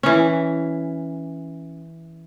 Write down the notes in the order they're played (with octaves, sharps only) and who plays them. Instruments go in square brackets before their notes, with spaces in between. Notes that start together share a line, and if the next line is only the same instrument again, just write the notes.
[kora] E3 C#4